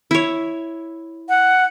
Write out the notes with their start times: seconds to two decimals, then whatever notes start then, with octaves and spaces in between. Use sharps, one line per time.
0.11 E4 C#5
1.29 F#5